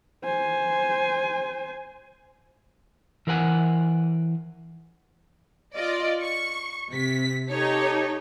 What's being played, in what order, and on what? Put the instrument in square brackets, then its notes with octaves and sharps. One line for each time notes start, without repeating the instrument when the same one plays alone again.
[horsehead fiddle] C5 G#5
[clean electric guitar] E3 A#4 C5 F#5 G#5
[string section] F4 D5 D#5
C#6
C3 B6
D#4 G4 A4 C#5